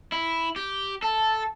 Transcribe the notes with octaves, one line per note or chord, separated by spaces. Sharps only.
E4
G4
A4 A5